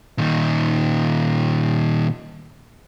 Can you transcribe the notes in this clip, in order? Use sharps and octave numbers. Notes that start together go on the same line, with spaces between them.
A#2 D#3